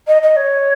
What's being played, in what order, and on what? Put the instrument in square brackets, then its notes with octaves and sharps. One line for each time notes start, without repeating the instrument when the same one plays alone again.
[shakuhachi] D#5
D#5
C#5